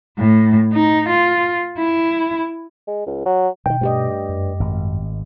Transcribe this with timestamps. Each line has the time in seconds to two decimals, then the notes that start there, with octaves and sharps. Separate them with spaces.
0.18 A2
0.73 D#4
1.09 F4
1.78 E4
2.88 G#3
3.06 C#2
3.26 F#3
3.66 B2 D3 D#3 G5
3.81 G2 A3 G4 D#5
4.29 F#2
4.60 G#1